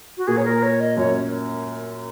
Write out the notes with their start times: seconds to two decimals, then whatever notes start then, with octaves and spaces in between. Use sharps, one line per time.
0.17 F#4
0.27 A#2 G#4
0.37 C#5
0.45 A#4
0.63 C#5
0.80 D#5
0.97 F#2 C#5